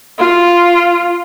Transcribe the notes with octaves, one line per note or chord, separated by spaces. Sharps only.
F4